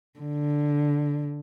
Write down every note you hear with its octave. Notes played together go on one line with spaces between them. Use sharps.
D3